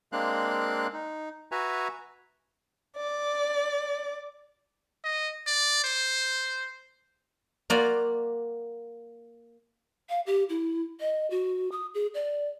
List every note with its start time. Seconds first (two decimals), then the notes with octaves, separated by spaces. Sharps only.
0.12 G#3 A#3 C4 D4 F5 F#6
0.93 D#4
1.52 F#4 B4 E5 G#5 A#5
2.95 D5
5.04 D#5
5.47 D5
5.84 C5
7.70 A#3 F4 F#4 D5
10.09 F5
10.26 G4
10.49 E4
11.00 D#5
11.30 F#4
11.72 D#6
11.95 G#4
12.14 D5